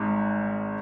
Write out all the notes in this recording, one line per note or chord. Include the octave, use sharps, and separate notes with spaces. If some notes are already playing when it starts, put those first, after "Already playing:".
Already playing: G#1 G#2